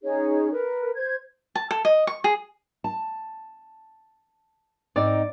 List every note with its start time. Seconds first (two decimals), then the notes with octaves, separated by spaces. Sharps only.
0.03 C#4 D#4 G#4 C#5
0.51 A#4 B4
0.95 C5 G#6
1.55 A5
1.71 A4
1.85 D#5
2.07 C#6
2.24 G#4
2.84 A5
4.96 G#2 C4 D#4 D5